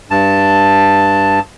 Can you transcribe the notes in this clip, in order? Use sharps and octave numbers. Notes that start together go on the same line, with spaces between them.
G2 A5